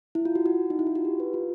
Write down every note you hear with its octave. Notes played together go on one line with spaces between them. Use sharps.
E4
F4
F#4
F#4
D#4
E4
F4
F#4
G4
B4
F4